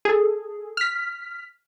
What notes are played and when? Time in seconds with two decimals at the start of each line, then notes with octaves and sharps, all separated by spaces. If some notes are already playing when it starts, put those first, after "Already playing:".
0.05 G#4 A4
0.77 F6 B6